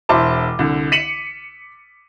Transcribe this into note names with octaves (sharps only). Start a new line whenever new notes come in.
E1 E4 C5 A5 D6
C2 D3
B6 C#7 D#7 E7 F#7